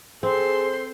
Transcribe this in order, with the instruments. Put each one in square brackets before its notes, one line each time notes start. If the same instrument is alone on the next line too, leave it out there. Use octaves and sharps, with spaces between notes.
[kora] C4 [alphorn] G#4 [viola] A4 C6 [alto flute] C5